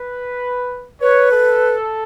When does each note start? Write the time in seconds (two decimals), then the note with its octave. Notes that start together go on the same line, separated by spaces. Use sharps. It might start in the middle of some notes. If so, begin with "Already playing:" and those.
Already playing: B4
1.01 B4 C#5
1.32 A4